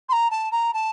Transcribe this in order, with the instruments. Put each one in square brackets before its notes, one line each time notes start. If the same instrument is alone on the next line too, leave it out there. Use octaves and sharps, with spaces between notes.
[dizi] C6
A#5
A5
A#5
A5